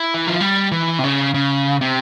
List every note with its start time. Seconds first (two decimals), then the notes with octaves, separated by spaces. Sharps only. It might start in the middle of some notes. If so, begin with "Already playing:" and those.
Already playing: E4
0.14 E3
0.27 F3
0.41 G3
0.72 E3
0.99 C3
1.04 C#3
1.34 C#3
1.81 C3